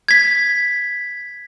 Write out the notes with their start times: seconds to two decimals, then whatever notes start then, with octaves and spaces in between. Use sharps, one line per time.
0.08 G#6 B6